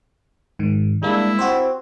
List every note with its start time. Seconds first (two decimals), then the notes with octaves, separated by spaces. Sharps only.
0.59 G#2 D#3
1.03 G3 G#3 A#3 D4 E4
1.39 C4 F#4 G4 C5